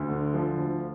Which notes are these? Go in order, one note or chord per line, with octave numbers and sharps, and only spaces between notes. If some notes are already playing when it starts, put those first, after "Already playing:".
Already playing: D2
D3
F3
D2